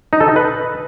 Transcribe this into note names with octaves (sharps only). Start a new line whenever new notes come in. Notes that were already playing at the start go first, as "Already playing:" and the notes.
D#4
A4
D#5
B4